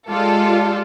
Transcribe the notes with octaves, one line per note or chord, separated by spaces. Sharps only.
G#3 F4 G4 A4 D5